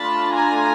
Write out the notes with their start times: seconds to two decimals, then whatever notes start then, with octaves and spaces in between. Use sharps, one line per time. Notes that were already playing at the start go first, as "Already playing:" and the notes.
Already playing: A3 D4 F4 A5 B5
0.36 G#5 A#5